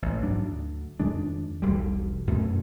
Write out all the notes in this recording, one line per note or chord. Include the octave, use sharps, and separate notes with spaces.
A1
G#2 F#3 D4
D2
F2 D#3 G#3 D4
E1 B1 D3 G3
F#2 B2 A3 C#4